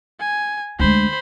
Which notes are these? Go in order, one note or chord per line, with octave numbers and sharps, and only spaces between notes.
G#5
D2 G#3 C5 B5